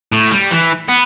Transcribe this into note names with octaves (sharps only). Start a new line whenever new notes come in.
A2
G3
E3
B3